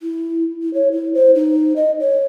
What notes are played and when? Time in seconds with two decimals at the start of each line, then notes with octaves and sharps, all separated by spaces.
0.02 E4
0.62 E4
0.74 C#5
0.92 E4
1.14 C5
1.35 D#4
1.76 D#5
2.00 C#5